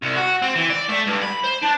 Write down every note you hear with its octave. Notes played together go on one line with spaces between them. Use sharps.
C2
F#4
C4
E3
D5
A3
G2
B5
C5
D4